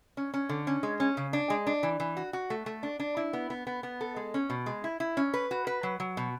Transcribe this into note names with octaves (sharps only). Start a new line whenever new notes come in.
C#4
C#4
D3
C#4
G#3
C#4
C#3
D4
G#3
D4
E3
E3
F#4
F#4
A3
A3
D4
D4
E4
B3
B3
B3
B3
A4
G#3
C#4
B2
G#3
E4
E4
C#4
B4
F#4
B4
F#3
F#3
B2